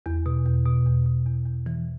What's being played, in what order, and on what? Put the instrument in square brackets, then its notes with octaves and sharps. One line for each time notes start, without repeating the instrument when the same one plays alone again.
[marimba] E2
B2
E2
B2
E2
B2
E2
E2
E3